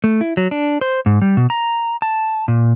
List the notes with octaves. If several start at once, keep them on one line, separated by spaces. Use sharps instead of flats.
A3
E4
F#3
D4
C5
G#2
G3
B2
A#5
A5
A#2